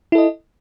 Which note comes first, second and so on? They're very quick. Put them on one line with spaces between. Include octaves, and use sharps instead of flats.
E4 A4 D#5